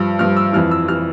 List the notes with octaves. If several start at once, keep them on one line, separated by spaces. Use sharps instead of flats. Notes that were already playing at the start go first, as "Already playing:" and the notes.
Already playing: G2 F3 E6
G2 F3 F6
E6
F2 E3 F6
E6
E3 F6